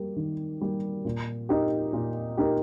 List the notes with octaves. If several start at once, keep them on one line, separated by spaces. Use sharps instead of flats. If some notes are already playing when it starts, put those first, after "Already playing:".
Already playing: G3 A#3 G4
D#3
G3 A#3 G4
A#2
A#3 D#4 G4
A#2
A#3 D#4 G4